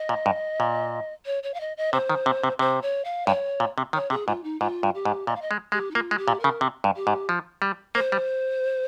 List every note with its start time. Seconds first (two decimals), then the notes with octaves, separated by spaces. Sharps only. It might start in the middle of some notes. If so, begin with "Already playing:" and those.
Already playing: D#5
0.09 A#2
0.26 G2
0.60 A#2
1.25 C#5
1.43 C#5
1.54 F5
1.60 D#5
1.77 D#5
1.93 C3 C5
2.10 D#3
2.26 C3
2.44 C3
2.59 C3 C5
2.82 C#5
3.04 F5
3.27 G2 C#5
3.60 A#2
3.78 C3
3.93 D#3 C#5
4.10 C3 G#4
4.27 G#2 F4
4.43 D#4
4.60 G#2 F4
4.83 G2
4.94 G4
5.05 G#2
5.27 A#2 D#5
5.35 F5
5.41 D#5
5.51 G#3
5.72 G#3 G4
5.91 D#4
5.95 A#3 F4
6.11 G#3
6.17 G4
6.28 A#2
6.40 C#3 A#4
6.61 C3
6.84 G2
6.96 G4
7.07 G#2
7.29 F3
7.62 G3
7.95 A#3 C5
8.12 G3